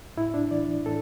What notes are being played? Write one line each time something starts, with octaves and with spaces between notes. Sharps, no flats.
A2 E4
D4
E3 D5
A2 A4